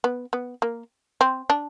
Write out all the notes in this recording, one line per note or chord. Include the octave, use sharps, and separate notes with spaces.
B3
B3
A#3
C4
D4